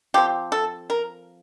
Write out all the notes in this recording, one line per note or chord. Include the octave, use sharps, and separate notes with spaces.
F3 C4 G4
A4
A#4